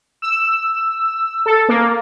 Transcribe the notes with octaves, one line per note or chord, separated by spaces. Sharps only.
E6
A4
A#3